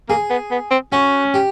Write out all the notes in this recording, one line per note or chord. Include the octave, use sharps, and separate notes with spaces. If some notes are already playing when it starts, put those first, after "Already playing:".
A#3 G#4
B3
B3
C4
C#4 F#4
G4